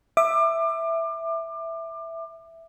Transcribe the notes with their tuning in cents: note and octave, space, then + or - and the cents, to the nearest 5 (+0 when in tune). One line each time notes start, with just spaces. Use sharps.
E5 +0 D6 +30